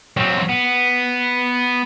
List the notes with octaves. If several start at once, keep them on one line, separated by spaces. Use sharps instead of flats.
F#3 C4
B3